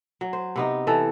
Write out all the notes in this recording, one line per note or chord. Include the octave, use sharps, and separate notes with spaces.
F#3
C5
C3 B3 D#4
E3 A4